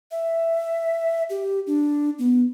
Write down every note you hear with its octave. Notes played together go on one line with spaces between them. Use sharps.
E5
G4
D4
B3